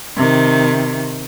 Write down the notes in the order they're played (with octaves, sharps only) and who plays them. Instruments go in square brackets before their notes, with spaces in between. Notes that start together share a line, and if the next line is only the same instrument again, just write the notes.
[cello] C3 D#3